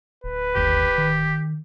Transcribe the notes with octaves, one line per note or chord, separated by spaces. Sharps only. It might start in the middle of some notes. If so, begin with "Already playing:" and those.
D1 B4
G1 D#2 G4
D#3